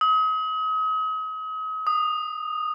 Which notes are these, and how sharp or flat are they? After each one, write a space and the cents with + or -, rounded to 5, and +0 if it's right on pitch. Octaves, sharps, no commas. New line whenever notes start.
D#6 +40
D#6 -15